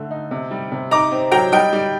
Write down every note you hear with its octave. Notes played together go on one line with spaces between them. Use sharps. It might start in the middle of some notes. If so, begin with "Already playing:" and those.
Already playing: D3 A3
D#4
C3
G3
C3
D#4 A#5 D6
C4
F#3 G5 A#5
G3 D#5 G5
G3